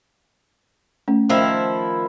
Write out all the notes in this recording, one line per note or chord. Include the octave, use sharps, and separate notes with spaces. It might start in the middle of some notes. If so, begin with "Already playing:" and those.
A3 C#4
D#3 F3 E4